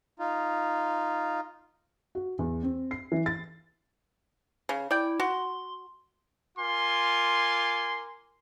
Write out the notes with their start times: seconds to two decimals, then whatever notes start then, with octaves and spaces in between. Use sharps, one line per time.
0.19 D#4 F4
2.15 F#4
2.39 E2
2.63 C4
2.91 C7
3.12 E3
3.26 A6
4.69 C#3
4.91 E4 D5 G5
5.20 F#4 C6
6.58 F4 A#4 G#5 C6 D6